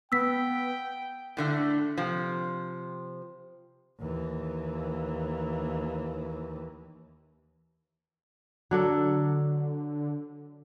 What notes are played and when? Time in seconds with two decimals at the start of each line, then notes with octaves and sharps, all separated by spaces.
0.12 B3 G5 E6 B6
1.37 A2 D3 A3
1.98 C3 F3
4.00 D#2 E3
8.71 D3 F#3 D4 A4